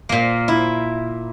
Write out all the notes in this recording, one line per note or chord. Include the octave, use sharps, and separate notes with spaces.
A#2 A#3
E4